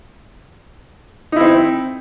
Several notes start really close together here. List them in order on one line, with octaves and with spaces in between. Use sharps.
D#4 E4 C4